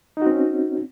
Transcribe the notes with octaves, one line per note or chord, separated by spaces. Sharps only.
C4 C#4 D#4 F#4